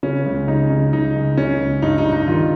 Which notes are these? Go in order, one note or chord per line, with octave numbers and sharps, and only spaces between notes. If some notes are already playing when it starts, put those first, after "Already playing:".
C#3 C#4
C#2
C#3 D#4
C#3
C#2 D#4
C#2
C#3 C#4
C#2
G2 D#4
D#4
G2
D#4
D#3 F4